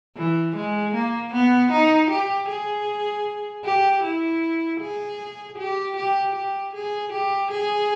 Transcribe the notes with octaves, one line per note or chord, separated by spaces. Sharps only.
E3
G#3
A#3
B3
D#4
G4
G#4
G4
E4
G#4
G4
G4
G4
G#4
G4
G#4